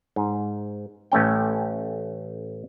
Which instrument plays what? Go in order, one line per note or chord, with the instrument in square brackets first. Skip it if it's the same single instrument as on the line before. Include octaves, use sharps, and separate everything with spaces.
[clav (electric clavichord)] G#2
A1 A3 C#4 G5